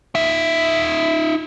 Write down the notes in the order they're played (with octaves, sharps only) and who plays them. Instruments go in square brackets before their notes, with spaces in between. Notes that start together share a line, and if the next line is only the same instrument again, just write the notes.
[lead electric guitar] D#4 E5